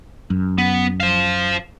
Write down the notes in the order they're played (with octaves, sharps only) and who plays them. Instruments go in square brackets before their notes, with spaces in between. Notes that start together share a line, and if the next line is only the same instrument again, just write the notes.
[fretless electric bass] F#2
[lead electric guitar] B3
C5 F5